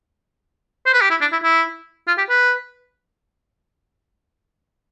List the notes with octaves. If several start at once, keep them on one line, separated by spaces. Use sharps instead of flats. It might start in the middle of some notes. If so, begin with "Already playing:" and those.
C5
B4
G4
E4
D4
E4
E4
F4
G4
B4